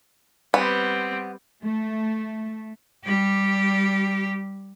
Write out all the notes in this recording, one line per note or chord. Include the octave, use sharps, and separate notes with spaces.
G3 B3 C4
A3
G3 G4